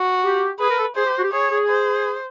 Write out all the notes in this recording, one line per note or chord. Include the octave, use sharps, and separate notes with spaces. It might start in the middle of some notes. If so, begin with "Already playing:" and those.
Already playing: F#4
G4
G#4 B4
A#4
A4
G#4 C5
G4
F#4
G4
G#4 C#5
G#4
C5